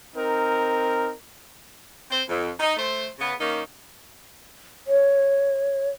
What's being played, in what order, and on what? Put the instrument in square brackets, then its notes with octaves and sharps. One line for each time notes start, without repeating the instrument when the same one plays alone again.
[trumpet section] C4 D#4 A#4
[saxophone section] C4 C5
F2
D#4
A3 C5
C#3 B3
D#3 A#3 C#4 D#4
[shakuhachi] C#5